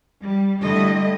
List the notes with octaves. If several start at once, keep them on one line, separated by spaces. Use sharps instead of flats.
G3
D3 G3 A3 E4 D#5